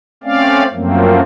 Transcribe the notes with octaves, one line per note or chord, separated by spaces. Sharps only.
A3 C4 C#4 D5 F5
F#2 F3 F#3 A3 A#3 C4